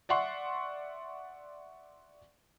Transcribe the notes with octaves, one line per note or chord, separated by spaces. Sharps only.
D5 E5 F#5 C6 C#6